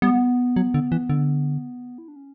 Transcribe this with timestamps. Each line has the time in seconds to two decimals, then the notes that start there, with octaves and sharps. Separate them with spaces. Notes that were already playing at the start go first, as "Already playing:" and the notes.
0.02 G3 B3
0.56 F#3
0.74 D3
0.92 E3
1.10 D3
1.98 E4
2.08 D4
2.16 C#4